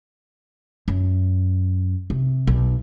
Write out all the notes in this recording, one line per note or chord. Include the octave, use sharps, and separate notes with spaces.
F#2
C3
B1